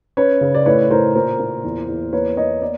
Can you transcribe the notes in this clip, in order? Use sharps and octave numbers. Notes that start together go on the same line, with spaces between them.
C#4 B4 C#5
C#3
D5
A2 B4 C#5
A2 A#4 C5
A#2 A#4 C5
A#3
E2
E2
A#3 B4 C#5
A#3 C#5 D#5
B3 D5